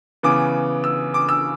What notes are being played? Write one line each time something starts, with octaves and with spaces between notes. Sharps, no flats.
C#3 E3 B3 D6
E6
D6
E6